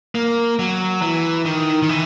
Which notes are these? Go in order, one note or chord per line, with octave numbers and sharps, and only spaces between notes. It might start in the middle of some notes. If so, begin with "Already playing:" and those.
A#3
F#3
E3
D#3
D#3
E3